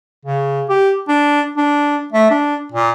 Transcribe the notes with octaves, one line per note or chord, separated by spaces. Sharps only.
C#3
G4
D4
D4
A3
D4
A#2